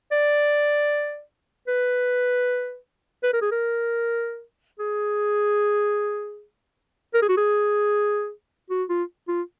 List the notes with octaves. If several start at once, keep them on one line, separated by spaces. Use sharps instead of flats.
D5
B4
B4
A#4
G#4
A#4
G#4
A#4
G#4
F#4
G#4
F#4
F4
F4